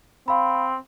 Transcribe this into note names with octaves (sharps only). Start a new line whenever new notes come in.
C4 F5 B5